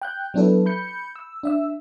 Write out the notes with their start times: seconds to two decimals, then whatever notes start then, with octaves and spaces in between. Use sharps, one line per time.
0.02 G5 F#6 G6
0.34 F#3 B3 D4 E4 A4 B4
0.66 B5 G6 C#7
1.16 E6
1.43 D4 E5 E6